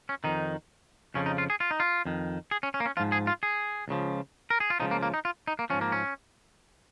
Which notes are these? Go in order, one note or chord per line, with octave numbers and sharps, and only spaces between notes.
C#4
F2 D#3 D#4
F2 C#3 F3 C#4
D#4
F4
G#4
F4
D#4
F4
F2 D#3
G#4
C#4
C#4
A#3
C#4
G#2 F3 F4
G#4
F4
G#4
C#2 C#3 F3
A#4
G#4
F4
C#2 C#3 F3 D#4
A#3
A#3
D#4
F4
D#4
A#3
G#2 F3 C#4
A#3
C#4